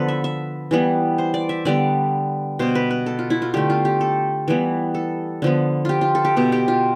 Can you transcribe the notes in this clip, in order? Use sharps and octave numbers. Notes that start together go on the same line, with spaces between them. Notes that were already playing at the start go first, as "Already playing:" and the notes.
Already playing: D3 F3 B3 A4 B4
E5
E5
E3 G3 B3
C5
D5
E5
D3 G3 B3 D5
B2 B3 C5
B4
B4
A4
F4
E4
F4
D3 A3 G4
F4
G4
A4
E3 G3 B3
A4
D3 F3 B3
F4 G4
F4
A4
G4
B2 B3 G4
G4
F4